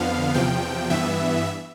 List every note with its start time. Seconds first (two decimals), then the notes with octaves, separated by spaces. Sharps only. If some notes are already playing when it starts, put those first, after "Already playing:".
Already playing: F2 D3 F3 B3 F5
0.34 E2 C3 F3 G5
0.90 G2 E3 B3 E5